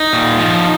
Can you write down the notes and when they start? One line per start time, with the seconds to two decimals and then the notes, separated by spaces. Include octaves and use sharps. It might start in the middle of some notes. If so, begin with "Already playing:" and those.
Already playing: D#4
0.13 A#2
0.39 F3